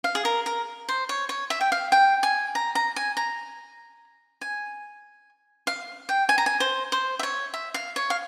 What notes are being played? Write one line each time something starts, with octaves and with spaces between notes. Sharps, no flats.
F5
G#4
A#4
A#4
C5
C#5
C#5
E5
G5
F5
G5
G#5
A#5
A#5
G#5
A#5
G#5
F5
G5
G#5
A#5
G#5
C5
C5
E5
C#5
E5
F5
C#5
F5